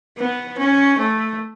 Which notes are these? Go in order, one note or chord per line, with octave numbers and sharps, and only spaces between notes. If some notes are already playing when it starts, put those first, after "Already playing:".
B3
C#4
A3